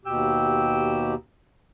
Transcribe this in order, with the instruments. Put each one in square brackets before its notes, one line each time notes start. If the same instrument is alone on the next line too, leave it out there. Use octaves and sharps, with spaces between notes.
[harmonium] D#2 B2 G4 [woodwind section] G5 E6